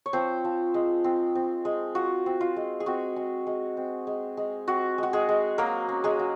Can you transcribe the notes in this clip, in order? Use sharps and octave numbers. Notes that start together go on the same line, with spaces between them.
C#5
F3 C4 C5
F3
G#3
C4
C4
G#3
F4 F#4
C4
F4
G#3
G#4
C4 F#4
G#3
G#3
C4
G#3
G#3
C4 F#4
G#3 F#4
G#3 G#4
G#3
F#3 A#3 A#4
C#4
G#3 G#4
F#3